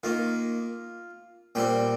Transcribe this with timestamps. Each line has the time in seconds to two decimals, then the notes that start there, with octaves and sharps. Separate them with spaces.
0.03 D#3 A#3 F4
1.55 A#2 G3 C4 G5